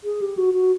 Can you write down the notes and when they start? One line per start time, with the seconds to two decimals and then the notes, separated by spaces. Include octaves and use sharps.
0.04 G#4
0.21 G4
0.37 F#4
0.54 F#4